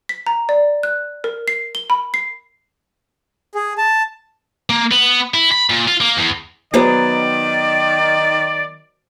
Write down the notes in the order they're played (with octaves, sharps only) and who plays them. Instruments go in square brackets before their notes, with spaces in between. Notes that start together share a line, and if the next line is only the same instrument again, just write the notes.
[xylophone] B6
A#5
D5
F#6
A#4
C7
G7
B5
C7
[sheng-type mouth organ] G#4
A5
[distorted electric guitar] A#3
B3
E4
B5
A#2
F4
A#3
E2
[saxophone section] D#3 [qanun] F#3 B3 G#4 [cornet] D5